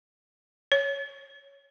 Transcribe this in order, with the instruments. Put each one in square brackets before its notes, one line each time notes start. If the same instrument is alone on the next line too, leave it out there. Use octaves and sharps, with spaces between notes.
[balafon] C#5